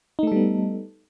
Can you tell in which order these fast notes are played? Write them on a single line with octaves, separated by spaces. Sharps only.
D#4 A3 A4 G3 B3